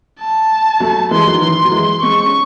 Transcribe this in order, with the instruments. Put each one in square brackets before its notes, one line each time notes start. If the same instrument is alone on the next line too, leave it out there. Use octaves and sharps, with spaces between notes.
[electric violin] A5
[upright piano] F#3 A3
[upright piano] E3 G#3 [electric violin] C6
[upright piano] D#3 F#3
[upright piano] E3 [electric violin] C6
[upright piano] F#3
E3 G#3
[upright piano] G#3 C4 [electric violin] C#6
[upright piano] C#4